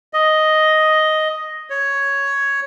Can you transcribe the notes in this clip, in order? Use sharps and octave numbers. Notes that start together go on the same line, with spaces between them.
D#5
C#5